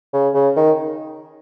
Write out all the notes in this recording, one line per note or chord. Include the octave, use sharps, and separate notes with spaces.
C#3
C#3
D#3